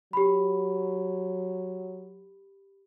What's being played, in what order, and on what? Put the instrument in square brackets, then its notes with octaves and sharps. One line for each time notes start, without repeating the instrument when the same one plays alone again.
[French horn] F#3 [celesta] G4 B5